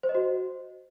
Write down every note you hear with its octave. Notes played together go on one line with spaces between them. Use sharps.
C5
D#5
F#4